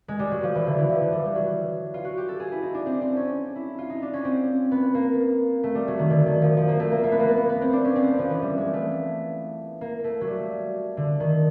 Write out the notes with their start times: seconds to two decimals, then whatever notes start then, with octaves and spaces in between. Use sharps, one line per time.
0.08 G#3
0.19 G3
0.31 F#3
0.43 F3
0.55 E3
0.67 D3
0.78 E3
0.89 F3
1.01 E3
1.12 G3
1.25 G3
1.35 F#3
1.94 F4
2.05 F#4
2.17 G4
2.29 A4
2.40 G#4
2.52 E4
2.62 D#4
2.74 D4
2.86 C4
3.01 C4
3.17 C#4
3.56 E4
3.78 F4
3.90 D#4
4.02 D4
4.13 C#4
4.24 C4
4.71 B3
4.94 A#3
5.63 A3
5.75 G3
5.88 F#3
5.99 D#3
6.10 D3
6.26 D#3
6.42 F3
6.57 F3
6.68 A#3
6.80 A3
6.91 A#3
7.03 A#3
7.12 B3
7.20 A#3
7.28 B3
7.37 A#3
7.49 B3
7.61 C4
7.73 D4
7.85 C#4
7.96 C4
8.08 B3
8.19 F3
8.30 E3
8.42 G3
8.57 G#3
8.73 A3
9.81 A#3
10.04 A3
10.21 F#3
10.27 G3
10.97 D3
11.20 D#3